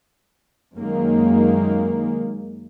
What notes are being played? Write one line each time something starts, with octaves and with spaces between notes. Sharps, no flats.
F#2 D#3 G#3 A#3